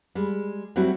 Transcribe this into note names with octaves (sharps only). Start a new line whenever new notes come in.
G3 G#3
F#3 G3 A3 C4 E4 F#4